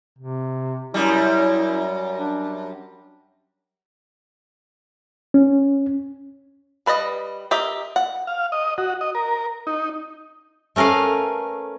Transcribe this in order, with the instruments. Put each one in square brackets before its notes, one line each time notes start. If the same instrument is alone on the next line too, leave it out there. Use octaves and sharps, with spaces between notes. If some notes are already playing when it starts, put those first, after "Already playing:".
[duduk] C3
[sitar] F#2 G3 [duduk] E4
[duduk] D4
[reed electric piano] C#4
[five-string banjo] G3 B4 D5 D#5
G4 A#4 D#5 E5
F#5
[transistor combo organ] F5
D#5
F#4
D#5
A#4
D#4
[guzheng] A3 C#4 A#4 B4 F5